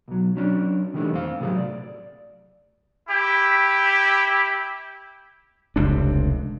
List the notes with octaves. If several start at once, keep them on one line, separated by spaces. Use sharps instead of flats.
B1 F#3
F#3 C#4 D4
D#3 E3 G3 A3 D4
F2 C4 F5
A2 C3 F#3 G#4
D5
E4 G4
F1 C#2 C3 D4